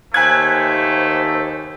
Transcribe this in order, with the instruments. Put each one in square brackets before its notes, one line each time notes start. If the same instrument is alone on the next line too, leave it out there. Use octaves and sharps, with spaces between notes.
[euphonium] D#2 [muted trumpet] A3 [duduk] C5 [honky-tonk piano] G#5 F#6 G#6